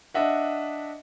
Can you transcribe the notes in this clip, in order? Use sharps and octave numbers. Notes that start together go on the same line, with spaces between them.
D4 D#5 E5 F#5